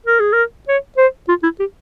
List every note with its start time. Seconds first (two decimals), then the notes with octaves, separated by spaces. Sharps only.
0.06 A#4
0.20 G#4
0.33 A#4
0.68 C#5
0.97 C5
1.29 F4
1.43 E4
1.60 G4